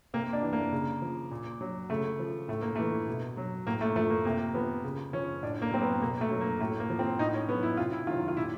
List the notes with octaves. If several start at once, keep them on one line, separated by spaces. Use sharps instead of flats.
C3 A#3
D4
E3
A#3
C#3
F3
A#2
F#3
C#3 A3
F3
A2 A3
A#3
E3 A3
B2
F#3
A2 A#3
A3
F3 A3
A#3
C3 A#3
F3 B3
C#3
F3 C#4
A2 D4
A#3
F#3 C4
B3
B2 A#3
A3
F#3
A#3
A2 A3
A#3
F3
C4
A2 D#4
C#4
F#3 B3
E4
C3 F4
E4
D#3 F#3 F4
F4
A#2 E4